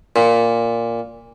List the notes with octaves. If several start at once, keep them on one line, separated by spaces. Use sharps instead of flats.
A#2